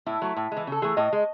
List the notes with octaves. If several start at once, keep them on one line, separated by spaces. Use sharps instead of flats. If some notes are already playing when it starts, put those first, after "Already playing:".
A2 E4
F#3 A3
A2
G#3
E3
C#3 A4
E3 A3 G#4
A2 D#5
G#3